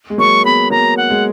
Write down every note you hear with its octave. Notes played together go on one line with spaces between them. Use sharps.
G#3
F#3 A#3 C#6
G#3 B3 B5
F#3 A#3 A#5
F#5
G#3